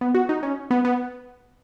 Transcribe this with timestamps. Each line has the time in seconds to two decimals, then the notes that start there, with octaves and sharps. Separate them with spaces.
0.01 B3
0.15 F#4
0.29 D#4
0.43 C#4
0.71 B3
0.85 B3